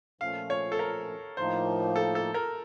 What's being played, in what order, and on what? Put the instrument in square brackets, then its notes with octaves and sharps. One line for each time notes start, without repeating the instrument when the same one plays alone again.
[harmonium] A#2 F3 A3 C#4 [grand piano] F5
[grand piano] C#5
A4
A#4
[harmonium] A2 F3 A#3 D#4 [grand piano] C5
[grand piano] A4
A4
A#4